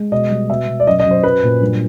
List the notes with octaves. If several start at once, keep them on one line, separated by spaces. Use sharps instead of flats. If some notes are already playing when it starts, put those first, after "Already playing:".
Already playing: G#3
B2 D#5
G3
B2 E5
B2
D5
F#2 D#5
D#5
F#2
C5
F#3 B4
A#2
G2